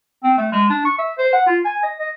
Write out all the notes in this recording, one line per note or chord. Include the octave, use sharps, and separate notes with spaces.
C4
A3
G#3
D4
C#6
E5
C5
F#5
F4
G#5
D#5
D#5